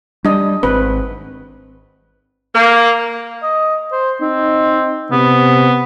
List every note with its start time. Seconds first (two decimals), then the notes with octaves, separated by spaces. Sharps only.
0.25 G3 D4 D#5
0.63 G#1 C4 B4
2.55 A#3
3.43 D#5
3.92 C5
4.21 C4 D#4
5.11 C3 B3